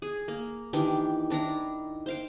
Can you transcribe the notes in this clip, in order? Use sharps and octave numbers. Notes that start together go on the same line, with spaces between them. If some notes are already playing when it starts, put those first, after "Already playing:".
G#4
A#3
D#3 E3 D4 G4
D#3 D4 E4 A#5
C5 F5 G5